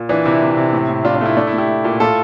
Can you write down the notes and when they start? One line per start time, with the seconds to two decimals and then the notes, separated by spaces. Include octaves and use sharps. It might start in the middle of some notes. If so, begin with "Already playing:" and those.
Already playing: A#2
0.09 E3 D4
0.25 C3 E4
0.42 C3
0.57 C3
0.73 A2
0.89 A2
1.04 A2 D4 F4
1.15 D4
1.21 A3 E4
1.37 A3 D4
1.47 E4
1.53 A3
1.58 E4 G4
1.68 A3
1.84 A#2
2.00 A2 F4 A4